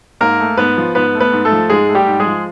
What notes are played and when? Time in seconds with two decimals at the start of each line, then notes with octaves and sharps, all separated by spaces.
0.21 G#2 A#3 A#4
0.40 A3
0.57 G#2 B3 B4
0.77 F3
0.95 G#2 B3 B4
1.15 A3
1.20 B3 B4
1.33 G#2
1.45 A3 A4
1.52 F3
1.70 G#2 G#3 G#4
1.89 A3
1.95 G3 G4
2.07 G#2
2.20 G#3 G#4
2.26 F3